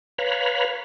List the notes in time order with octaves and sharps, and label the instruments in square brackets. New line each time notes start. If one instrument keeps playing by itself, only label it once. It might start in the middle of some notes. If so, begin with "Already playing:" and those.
[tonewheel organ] B4 C#5 F5 A#5 B5